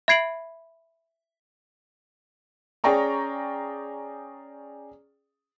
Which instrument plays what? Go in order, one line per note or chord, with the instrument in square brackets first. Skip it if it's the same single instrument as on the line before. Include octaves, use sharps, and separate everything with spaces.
[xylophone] E5 B5 G#6 C7 D7 F#7
[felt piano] C#4 G#4 D5 G5 A#5 C#6